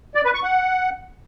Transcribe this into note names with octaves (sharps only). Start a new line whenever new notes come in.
D5
B4
C#6
F#5